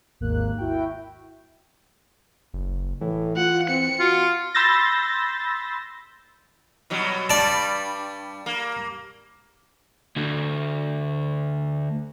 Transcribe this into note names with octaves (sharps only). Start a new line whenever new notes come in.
G#1 D#2 A#3 F#6
E4 F#4 G5
F#1
A2 E3
F4 F#5
C4 C#7
F4 F#4
B5 C6 E6 G6 A6 A#6
B2 F#3 G3
G2 G3 D5 A5
A#3
D2 D3